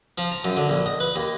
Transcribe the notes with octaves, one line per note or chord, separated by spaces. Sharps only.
F3
A#5
F#2
D3
A#1
D#5
B4
D#2